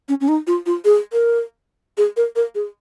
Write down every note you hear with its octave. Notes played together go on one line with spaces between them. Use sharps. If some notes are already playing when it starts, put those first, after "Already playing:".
C#4
C#4
D#4
F4
F4
G#4
A#4
G#4
A#4
A#4
G#4